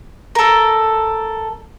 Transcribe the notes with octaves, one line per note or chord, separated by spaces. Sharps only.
A4 A#4